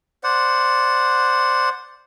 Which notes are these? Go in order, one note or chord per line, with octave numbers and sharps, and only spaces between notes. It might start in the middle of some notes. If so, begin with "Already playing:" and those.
C5 D5 F#5